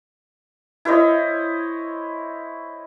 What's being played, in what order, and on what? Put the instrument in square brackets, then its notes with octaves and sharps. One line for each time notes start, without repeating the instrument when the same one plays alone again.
[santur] E4 C5 C#5 D#5